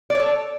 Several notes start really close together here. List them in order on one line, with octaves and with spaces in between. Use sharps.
D5 C#5 A4